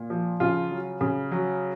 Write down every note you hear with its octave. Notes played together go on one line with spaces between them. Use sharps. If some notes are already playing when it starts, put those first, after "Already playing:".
Already playing: A#2
F3
C#3 F4
F#3
C#3
F#3